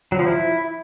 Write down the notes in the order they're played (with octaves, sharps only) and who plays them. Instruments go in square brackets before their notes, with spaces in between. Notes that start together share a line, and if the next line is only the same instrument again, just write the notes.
[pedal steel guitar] F#3
F3
E4